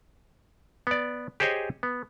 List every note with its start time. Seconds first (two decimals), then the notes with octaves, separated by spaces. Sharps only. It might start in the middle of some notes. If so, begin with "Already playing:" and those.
0.87 B3 D5
1.40 G4 G#4 C5 C#5 D#5 G#5
1.83 B3